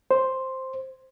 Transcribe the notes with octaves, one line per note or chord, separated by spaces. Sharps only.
C5